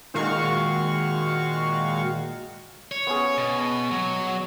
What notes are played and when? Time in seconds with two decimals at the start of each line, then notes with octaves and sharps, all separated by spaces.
0.14 A#2 D#3 G#3 F#4 F5 C#6
2.91 C#5
3.07 B3 C#4 G#4
3.37 B2
3.91 F#3